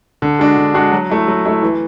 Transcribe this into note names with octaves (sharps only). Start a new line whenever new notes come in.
D3
G#3 D4 F#4
D3
G#3 D4 F#4
F#3
A3 E4
F#3
A3 E4
E3